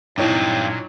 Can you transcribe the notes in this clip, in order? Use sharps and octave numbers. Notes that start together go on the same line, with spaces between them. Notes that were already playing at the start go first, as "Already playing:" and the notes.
G2 A#2 F#3 C4 D#4 E4 C#5 D6